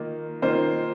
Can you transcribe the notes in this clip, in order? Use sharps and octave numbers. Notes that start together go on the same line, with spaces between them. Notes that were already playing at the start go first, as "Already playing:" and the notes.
Already playing: D#3 A#3 F4
D#3 A#3 F4 C5